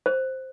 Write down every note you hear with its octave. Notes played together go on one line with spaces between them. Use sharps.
C5